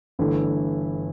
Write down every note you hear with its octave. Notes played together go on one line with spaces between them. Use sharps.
G1 G2 E3 A3 E4